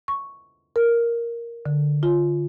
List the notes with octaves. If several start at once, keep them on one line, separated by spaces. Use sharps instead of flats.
C#6
A#4
D3
F4